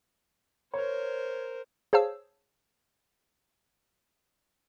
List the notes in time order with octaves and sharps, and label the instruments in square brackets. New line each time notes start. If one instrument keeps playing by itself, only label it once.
[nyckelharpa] A#4 C5 [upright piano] C#5
[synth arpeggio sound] G#4 C5 C#5 F5 A5 E6